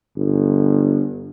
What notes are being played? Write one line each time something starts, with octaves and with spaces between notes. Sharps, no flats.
G1